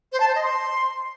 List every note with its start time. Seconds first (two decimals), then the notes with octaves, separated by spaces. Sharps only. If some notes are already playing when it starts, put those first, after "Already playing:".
0.13 C5
0.20 A5
0.28 C5
0.35 D#5
0.43 C6